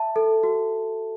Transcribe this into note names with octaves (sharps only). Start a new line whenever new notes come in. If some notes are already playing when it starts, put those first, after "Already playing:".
Already playing: E5 A5
A4
F#4